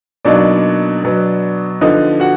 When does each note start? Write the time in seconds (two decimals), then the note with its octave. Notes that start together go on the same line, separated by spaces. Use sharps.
0.25 B2 F#3 A#3 D4 D#4 D5
1.04 B2 F#3 B3
1.81 D3 F3 B3 D#4 D#5
2.20 F#4 F#5